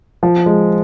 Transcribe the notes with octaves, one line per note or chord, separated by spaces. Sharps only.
F3
G#3